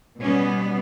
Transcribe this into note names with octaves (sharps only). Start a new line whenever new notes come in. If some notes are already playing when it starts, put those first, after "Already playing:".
B2 G3 B3 C#4